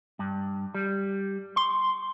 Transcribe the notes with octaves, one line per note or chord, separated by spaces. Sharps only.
G2
G3
C6